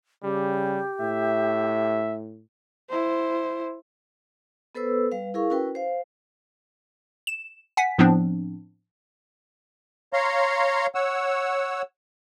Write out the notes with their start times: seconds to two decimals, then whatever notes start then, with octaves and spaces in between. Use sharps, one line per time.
0.24 C#3 G3 G4
1.01 A2 E5
2.90 E4 C5
4.75 B3 A4 B4 C5 E6
5.12 G3 B4 F5
5.34 E4 G#4 A#4 F5 C#6
5.50 C#4 E4 F#4 A#4 B4 G5
5.75 C5 F5
7.27 E7
7.77 F#5 G#5 B6
7.99 A2 F3 B3 C4 D4
10.13 C#5 F5 A#5 C6
10.95 C#5 F#5 E6